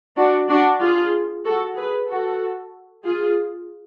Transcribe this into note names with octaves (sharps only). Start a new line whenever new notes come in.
D4 F#4
D4 F#4
F4 G#4
F#4 A4
G#4 B4
F#4 A4
F4 G#4